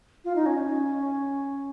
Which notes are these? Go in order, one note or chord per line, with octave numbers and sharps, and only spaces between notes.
F4
D#4
C#4